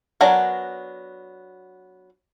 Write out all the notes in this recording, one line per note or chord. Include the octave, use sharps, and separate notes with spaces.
F#3 B3 D4 A#4 G#5